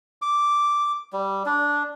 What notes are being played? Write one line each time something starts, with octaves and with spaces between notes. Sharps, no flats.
D6
G3
D4